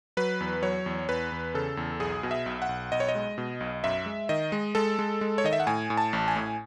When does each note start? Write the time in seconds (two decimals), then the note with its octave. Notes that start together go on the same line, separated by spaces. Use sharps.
0.17 F#3 B4
0.40 E2
0.62 F#3 C#5
0.86 E2
1.09 E2 B4
1.32 E2
1.54 C#3 A4
1.77 E2
2.00 B1 G#4
2.23 B2
2.31 E5
2.46 B1
2.62 F#5
2.69 B1
2.92 B1 D#5
3.00 C#5
3.09 D#5
3.15 G#3
3.38 B2
3.60 B1
3.84 F#2 E5
4.06 G#3
4.29 D#3 D#5
4.52 G#3
4.75 G#3 A4
4.99 G#3
5.21 G#3
5.38 C#5
5.44 D#3 D#5
5.53 E5
5.60 F#5
5.67 A2 G#5
5.90 A2
5.97 A5
6.13 A1
6.28 G#5
6.36 A2